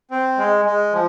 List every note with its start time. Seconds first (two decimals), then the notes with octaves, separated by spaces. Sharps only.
0.11 C4
0.38 G#3
0.65 G#3
0.93 F3